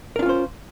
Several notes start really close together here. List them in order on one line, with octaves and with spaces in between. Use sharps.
A#4 D4 F4 C#4 C5